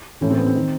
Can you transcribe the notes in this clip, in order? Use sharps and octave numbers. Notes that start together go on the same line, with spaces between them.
A2 E3 C#4
C4
B3
C4
D#3